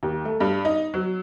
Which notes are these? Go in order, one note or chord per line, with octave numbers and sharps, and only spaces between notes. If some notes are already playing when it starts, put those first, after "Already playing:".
D#2
A3
G2
D#4
F#3